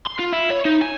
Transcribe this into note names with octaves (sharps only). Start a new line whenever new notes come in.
C6
F4
E4
C#5
D#4
G#5